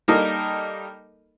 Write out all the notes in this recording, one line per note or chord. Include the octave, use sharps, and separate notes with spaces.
G3 A#3 D#4 A4 A#4 D#5